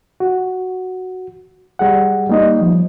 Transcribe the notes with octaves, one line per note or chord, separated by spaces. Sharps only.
F#4
G3 G#4 F#5
G3 A#3 D#4 D#5
F3